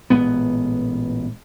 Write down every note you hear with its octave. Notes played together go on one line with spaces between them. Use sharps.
A1 A#2 G#3 B3